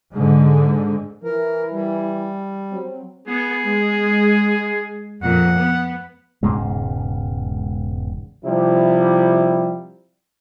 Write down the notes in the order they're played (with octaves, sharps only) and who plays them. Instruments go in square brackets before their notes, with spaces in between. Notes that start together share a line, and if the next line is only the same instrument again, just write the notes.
[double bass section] G#2 D3
[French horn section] E3 [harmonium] A#4
[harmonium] G3
[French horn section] F#3 C4
[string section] B3 [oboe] G#4
[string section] G#3
[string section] F2 A#2 [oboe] F#5
[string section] B3
[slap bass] E1 G#2 C#3 G#3
[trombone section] C3 F3 G3 E4